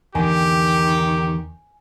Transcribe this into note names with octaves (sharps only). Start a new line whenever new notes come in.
E2 D3 D#3 G4 G#5